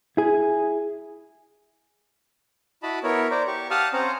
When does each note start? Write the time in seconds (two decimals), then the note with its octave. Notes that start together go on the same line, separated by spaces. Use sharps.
0.17 E4 G#4
2.83 E4 F#4 D#5 A5 B5
3.03 B3 E4 A#4 C#5
3.31 C5 D5 A#5
3.47 G4 C#6
3.71 G4 F5 F#5 A5 D#6 F6
3.93 C4 C#4 C5 F#5 A#5